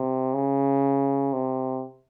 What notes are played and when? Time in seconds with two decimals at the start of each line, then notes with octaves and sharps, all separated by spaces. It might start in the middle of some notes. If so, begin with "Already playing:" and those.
Already playing: C3
0.34 C#3
1.33 C3